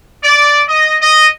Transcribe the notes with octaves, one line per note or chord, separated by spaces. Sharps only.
D5
D#5
D#5